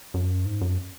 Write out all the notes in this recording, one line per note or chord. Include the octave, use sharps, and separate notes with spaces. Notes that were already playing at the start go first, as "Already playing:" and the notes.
F#2
G#2
F#2